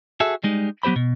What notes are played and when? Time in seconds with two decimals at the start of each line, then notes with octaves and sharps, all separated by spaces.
0.20 F#4 G#4 A4 E5
0.44 G3 G#3 D#4
0.83 F#3 B3 G4 C5 B5
0.96 B2